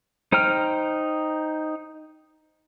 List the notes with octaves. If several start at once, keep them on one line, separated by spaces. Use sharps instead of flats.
D#4 C5 G5 A#5 F6